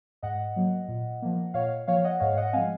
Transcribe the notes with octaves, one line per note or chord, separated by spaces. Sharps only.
G#2 D#5 F#5
F#3 A#3
A#2
F3 A#3
A#2 C#5 F5
F3 A#3 C#5 F5
D#5 F#5
G#2 C#5 F5
D#5 F#5
F#5
F3 G#3 C4 F5 G#5